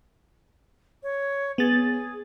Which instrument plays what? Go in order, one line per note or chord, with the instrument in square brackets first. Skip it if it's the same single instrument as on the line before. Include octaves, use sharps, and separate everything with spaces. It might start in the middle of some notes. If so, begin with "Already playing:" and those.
[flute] C#5
[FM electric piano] B3 A6 [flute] G#4